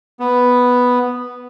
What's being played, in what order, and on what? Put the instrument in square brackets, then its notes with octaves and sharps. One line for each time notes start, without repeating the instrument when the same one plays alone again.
[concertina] B3